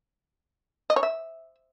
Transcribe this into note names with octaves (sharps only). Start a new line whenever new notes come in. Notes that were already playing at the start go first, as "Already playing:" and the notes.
D#5
C#5
E5